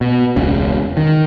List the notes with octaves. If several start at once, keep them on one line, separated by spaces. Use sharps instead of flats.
B2
E1 C#2 C#3
D#3